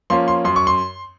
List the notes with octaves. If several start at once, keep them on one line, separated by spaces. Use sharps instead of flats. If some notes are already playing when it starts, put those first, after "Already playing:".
F3 A#3 C#4 C6
C6
F#2 C6
C#6
C6